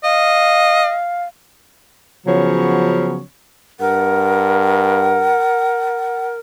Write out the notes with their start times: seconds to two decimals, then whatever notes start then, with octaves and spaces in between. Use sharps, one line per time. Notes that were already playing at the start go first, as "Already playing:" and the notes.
0.04 D#5 F5
2.26 C#3 F3 F#3 B3 C#4 C#5
3.80 G2 A#4 F#5